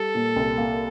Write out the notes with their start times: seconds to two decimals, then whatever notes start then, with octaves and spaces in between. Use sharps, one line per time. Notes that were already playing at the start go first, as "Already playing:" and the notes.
Already playing: G3 A4
0.15 A#2
0.36 C2
0.58 A#3